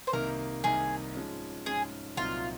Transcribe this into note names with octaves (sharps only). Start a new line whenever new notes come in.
C5
C2 C3 D#3 A#3 D#4 A#4
C2 C3 D#3 A#3 D#4 G#4
G#2 F3 G#3 C#4
G#2 F3 G#3 C#4 G#4
C2 A#2 F#3 C4 D#4 F4